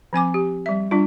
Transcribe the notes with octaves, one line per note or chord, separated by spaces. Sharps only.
F3 C4 G#5 D6
G4
G3 E5
G3 D4 F4